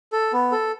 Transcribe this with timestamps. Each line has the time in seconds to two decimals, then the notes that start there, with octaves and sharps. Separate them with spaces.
0.12 A4
0.33 B3
0.52 A4